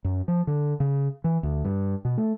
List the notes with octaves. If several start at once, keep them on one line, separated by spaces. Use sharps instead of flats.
F#2
F3
D3
C#3
E3
D2
G2
B2
A3